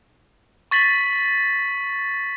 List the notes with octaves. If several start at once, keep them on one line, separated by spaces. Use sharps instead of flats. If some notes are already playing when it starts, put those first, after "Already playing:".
C#6 A6 B6 F#7